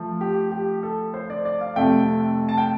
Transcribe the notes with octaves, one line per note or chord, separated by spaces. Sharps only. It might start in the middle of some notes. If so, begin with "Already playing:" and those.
Already playing: F3 A3
G4
G4
A4
C5
D5
D5
F5
F2 C3 A3 G5
A5
G5